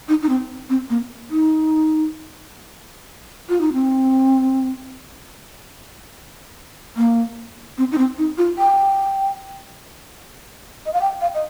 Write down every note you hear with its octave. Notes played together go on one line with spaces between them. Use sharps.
D#4
D#4
C4
C4
A#3
D#4
F4
D#4
C4
A#3
C4
D#4
C4
D#4
F4
G5
D#5
F5
G5
F5
D#5